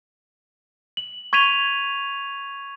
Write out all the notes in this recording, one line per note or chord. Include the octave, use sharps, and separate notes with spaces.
F#7
C#6 G#6 B6 D#7 F7